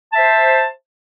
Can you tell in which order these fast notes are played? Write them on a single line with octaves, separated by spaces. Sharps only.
A5 E5 C5